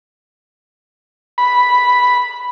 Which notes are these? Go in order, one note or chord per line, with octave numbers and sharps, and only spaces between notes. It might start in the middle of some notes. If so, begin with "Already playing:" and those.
B5